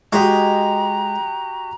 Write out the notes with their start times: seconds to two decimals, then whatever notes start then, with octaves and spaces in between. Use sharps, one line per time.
0.13 G#3 F#4 G4 D#5 A#5